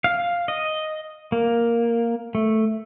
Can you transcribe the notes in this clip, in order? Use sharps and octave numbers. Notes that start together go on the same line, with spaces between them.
F5
D#5
A#3
A3